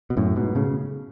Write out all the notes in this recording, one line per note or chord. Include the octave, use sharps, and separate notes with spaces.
B2
F#2 A2
G#2 B2
A2 C#3